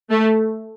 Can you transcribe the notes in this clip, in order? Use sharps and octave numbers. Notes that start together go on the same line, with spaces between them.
A3